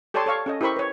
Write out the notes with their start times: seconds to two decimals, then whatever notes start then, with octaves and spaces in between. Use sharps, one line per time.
0.14 G4 A4 C#5 D5 A5 C6
0.26 A4 C#5 F5 C#6
0.46 C#4 A4 D#5
0.61 E4 G4 A#4 C5 B5 C#6
0.76 B4 C#5